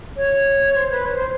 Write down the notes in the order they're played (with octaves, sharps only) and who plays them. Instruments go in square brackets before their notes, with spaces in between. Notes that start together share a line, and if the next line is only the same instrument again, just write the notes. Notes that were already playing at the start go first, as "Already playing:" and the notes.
[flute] C#5
C5
B4
C#5
C5